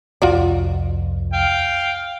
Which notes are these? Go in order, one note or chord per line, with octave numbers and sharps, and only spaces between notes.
C2 F2 F4 F#4 D5
F5 G5